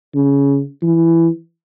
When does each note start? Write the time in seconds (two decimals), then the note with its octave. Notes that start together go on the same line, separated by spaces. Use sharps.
0.15 C#3
0.82 E3